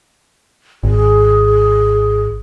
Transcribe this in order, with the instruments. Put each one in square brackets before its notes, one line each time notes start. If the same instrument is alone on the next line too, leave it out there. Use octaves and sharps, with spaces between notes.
[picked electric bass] G#1 [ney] G#4